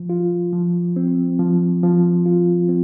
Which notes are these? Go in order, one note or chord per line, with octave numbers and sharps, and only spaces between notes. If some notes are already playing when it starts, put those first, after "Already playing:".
Already playing: F3
F4
F3
C4
F3
F3
F4
C4